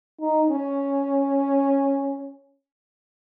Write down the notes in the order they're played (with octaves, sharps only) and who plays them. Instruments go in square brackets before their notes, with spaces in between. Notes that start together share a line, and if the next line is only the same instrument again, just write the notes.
[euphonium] D#4
C#4